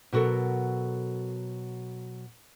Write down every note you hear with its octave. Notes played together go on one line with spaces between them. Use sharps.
B2 F#3 F#4 A4 A#4